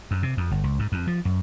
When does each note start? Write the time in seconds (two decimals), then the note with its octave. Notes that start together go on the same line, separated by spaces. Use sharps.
0.11 F#2
0.23 C3
0.37 F2
0.51 G1
0.64 C#2
0.79 G#2
0.92 F2
1.07 F3
1.25 F#2